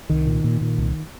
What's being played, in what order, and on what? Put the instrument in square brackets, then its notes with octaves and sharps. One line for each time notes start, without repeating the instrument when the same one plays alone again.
[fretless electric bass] C2 D#3
A#2
A#2
A#2
C2